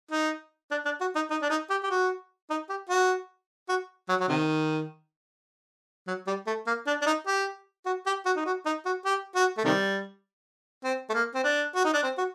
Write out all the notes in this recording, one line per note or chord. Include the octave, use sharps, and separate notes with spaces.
D#4
D4
D4
F#4
D#4
D#4
D4
D#4
G4
G4
F#4
D#4
G4
F#4
F#4
F#3
F#3
C3 D#3
F#3
G3
A3
A#3
D4
D4
D#4
G4
F#4
G4
F#4
D#4
F#4
D#4
F#4
G4
F#4
A3
C3 D#3 G3
C4
A3
A#3
C4
D4
F#4
D#4
D4
C4
F#4